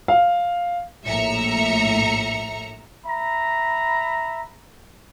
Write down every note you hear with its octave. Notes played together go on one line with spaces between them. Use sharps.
F5
A#1 A2 E5 A#5 C#7
E5 A#5 B5